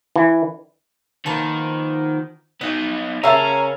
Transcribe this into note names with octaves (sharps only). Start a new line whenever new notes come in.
E3
D#3 F3 A#3 B3
B3 D#4 D#5
C#3 A#3 C#4 E5 F5 A5 A#5